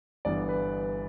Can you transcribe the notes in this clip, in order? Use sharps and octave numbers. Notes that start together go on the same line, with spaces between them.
G1 G2 E3 B3 D5
B4